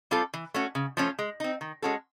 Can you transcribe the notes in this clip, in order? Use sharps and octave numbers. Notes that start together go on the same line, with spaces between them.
G3 C4 F4 A4
E3
A3 C#4 F#4
C#3
F3 A3 C#4 F4
G#3
C4 D#4
D#3
G#3 C#4 F#4 A4